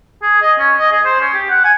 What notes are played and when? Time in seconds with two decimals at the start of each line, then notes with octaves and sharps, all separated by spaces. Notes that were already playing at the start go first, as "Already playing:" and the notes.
0.22 G#4
0.42 D#5
0.59 C#4
0.77 D#5
0.91 G#4
1.04 C5
1.20 C#4
1.34 G4
1.50 F#5
1.64 G#5